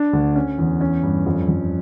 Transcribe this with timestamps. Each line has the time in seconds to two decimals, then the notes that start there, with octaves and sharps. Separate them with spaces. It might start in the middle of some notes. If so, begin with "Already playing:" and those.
Already playing: D4
0.13 D2
0.36 C#4
0.58 E2
0.81 C#4
1.03 G2
1.26 F2
1.49 F2